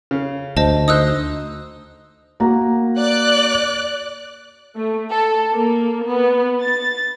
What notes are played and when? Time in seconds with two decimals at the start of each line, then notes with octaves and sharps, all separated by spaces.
0.11 C#3
0.57 D2 C5 D#5 A5
0.88 D#4 C5 D#6 E6 F#6
2.40 A#3 F#4 A#5
2.98 D5 F#6
4.76 A3
5.10 A4
5.53 A#3
6.07 B3
6.61 A6